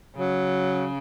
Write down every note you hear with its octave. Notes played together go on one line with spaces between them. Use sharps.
C#3 F#3